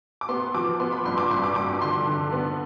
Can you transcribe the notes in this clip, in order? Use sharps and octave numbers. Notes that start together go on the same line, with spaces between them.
D6
B3 C6
F3 D6
B3 C6
B5
G2 C6
D6
G2 C6
D6
G2 D6
D6
D3 C6
D3
B3